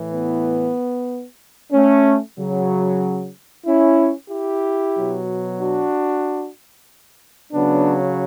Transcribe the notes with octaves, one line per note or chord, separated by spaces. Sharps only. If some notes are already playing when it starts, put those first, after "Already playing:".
Already playing: A2 E3
B3
A3 C#4
C#3 F#3
C#4 E4
E4 G4
B2 F#3
D4 F#4
C#3 F#3 B3 D4